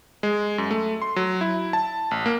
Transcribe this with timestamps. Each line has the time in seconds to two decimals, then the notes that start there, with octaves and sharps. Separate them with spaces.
0.23 G#3
0.58 F#2
0.71 A3
1.02 C6
1.16 F#3
1.41 E4
1.73 A5
2.11 A1
2.26 A#3